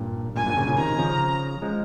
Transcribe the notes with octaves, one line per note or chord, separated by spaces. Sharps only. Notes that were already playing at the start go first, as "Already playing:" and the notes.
Already playing: G2 A#2
G2 A#2 G#5
G2 A#2
A#2 C#3
A#2 C#3
C3 D#3 A#5
C#3 F3
F3 G#3